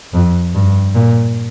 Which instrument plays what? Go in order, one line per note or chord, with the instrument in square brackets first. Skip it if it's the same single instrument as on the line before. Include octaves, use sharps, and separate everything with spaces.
[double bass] F2
G2
A#2